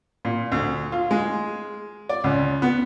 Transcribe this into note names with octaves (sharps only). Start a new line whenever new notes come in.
A#2
D2
F4
G#3
D5
C#2
B3